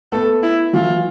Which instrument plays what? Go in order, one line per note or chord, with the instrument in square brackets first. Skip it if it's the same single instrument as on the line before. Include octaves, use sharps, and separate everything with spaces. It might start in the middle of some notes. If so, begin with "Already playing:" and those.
[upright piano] A3 B3 [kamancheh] A4
[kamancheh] E4
[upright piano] E3 F#3 [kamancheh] F4